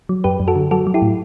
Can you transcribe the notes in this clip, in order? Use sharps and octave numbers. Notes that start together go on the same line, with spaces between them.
F#3
F#2 G4 B4
F#2
F#4 A4
D3
F#3 F#4 A4
F#3
E4 G4
A2